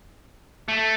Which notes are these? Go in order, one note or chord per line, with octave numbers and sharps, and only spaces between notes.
A3